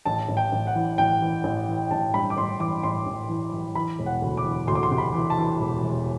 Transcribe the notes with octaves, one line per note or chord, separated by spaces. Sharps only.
A1 A5
A1
G5
A1
F#5
E3
A1 G5
E3
A1
E3
A1 A5
G2 B5
D6
A1 C6
E3 D6
A1 C6
A1
E3
E3
E3 B5
E1
F#5
D2
D6
E3
D2 C6
D6
C6
C3
B5
E3
A5
E3
E1
E1